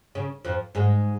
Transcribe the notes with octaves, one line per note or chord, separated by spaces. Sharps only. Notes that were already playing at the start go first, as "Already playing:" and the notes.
C#3
F2 F3
G#2 G#3